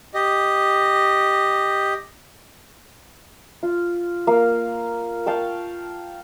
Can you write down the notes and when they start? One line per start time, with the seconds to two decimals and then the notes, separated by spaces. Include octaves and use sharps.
0.14 G4 D#5
3.63 F4
4.27 A#3 F5
5.26 F5 G5 A5 C#6